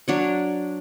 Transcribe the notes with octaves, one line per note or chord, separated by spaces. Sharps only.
F#3 D4 C#5